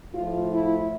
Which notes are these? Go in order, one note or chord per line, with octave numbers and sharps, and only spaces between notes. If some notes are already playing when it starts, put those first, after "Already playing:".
A2 F3 A3 F4
E4